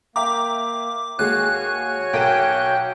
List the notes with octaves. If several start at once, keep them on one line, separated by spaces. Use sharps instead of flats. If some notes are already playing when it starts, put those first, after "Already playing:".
A#3 E5 G5 A#5 D6
D#2 G#3 F#4 G#4 C#5 G#5 F#6
B1 A#4 G5 D#7